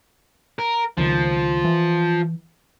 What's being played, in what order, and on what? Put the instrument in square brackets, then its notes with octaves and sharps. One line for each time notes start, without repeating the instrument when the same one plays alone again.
[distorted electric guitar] A#4
[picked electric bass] C#2 D#3 [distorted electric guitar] F3
[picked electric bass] E3